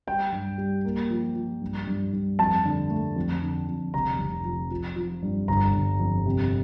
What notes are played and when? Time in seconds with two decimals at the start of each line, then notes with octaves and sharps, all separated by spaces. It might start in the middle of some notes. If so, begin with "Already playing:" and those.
0.07 G3 G5
0.32 G2
0.58 G3
0.85 A#3
1.10 F3
1.35 F3
1.61 G2
1.87 G2
2.13 G2
2.39 F2 A5
2.65 D3
2.90 A3
3.16 F2
3.41 D3
3.68 F2
3.94 F1 A#5
4.19 F1
4.45 F3
4.71 F3
4.96 F3
5.22 G2
5.48 G1 A#5
5.74 G1
6.00 F2
6.25 C3